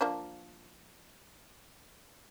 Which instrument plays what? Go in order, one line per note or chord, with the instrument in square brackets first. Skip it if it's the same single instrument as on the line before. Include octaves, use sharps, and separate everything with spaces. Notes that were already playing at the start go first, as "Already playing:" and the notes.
[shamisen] F3 A#3 D4